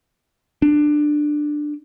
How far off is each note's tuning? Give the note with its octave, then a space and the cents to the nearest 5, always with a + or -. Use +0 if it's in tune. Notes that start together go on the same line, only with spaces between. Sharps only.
D4 +15